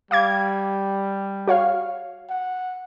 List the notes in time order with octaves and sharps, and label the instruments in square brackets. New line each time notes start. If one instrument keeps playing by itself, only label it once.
[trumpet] G3 [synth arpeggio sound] F5 D6 G#6
[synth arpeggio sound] F#4 C#5 F5
[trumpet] F#5